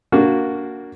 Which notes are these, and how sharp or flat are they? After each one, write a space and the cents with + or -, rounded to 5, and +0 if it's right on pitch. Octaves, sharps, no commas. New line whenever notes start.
A#3 +0 D4 -25 F#4 +0